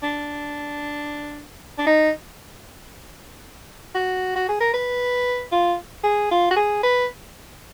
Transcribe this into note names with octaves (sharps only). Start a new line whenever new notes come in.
D4
D4
D#4
F#4
F#4
G#4
A#4
B4
F4
G#4
F4
F#4
G#4
B4